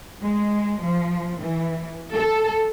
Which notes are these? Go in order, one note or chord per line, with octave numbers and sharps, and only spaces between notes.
G#3
F3
E3
A4